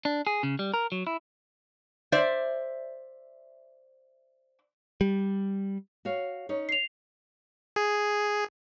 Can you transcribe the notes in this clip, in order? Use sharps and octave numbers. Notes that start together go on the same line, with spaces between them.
D4
G#4
C#3
G3
A#4
F#3
E4
C5 D5 E5
G3
F#4 C#5 F5
C#4 D#4 C#5
C7 F7
G#4